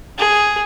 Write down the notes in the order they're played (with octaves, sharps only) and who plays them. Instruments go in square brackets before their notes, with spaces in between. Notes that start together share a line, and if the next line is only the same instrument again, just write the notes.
[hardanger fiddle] G#4